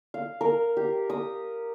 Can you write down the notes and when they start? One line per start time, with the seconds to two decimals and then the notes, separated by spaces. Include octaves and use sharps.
0.14 F5
0.41 A#4
0.77 G4
1.10 D#6